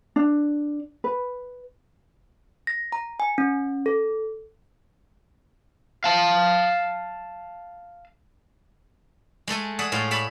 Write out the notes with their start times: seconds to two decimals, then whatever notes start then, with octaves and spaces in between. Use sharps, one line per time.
0.16 D4
1.04 B4
2.67 A#6
2.92 A#5
3.20 G#5
3.38 C#4
3.86 A4
6.04 F5 A5
9.47 G#3 A3 A4 G#5
9.79 G#4 D5 E5 F#5
9.92 A2 G#3 F5 A5
10.11 C#5 D5 E5 A5 B5